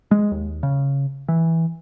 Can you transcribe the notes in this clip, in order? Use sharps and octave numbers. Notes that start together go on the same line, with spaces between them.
G#3
D#2
C#3
E3